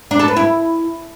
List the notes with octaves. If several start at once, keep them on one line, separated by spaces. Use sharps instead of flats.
D4
A4
B4
E4